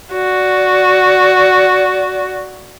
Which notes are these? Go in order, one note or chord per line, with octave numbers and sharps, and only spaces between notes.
F#4 D5